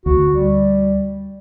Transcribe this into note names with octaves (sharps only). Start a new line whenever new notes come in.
D2 F#4
G3